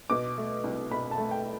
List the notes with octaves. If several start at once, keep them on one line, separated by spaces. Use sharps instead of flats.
B2 D6
A3
C2
B2 B5
A5
A3
G5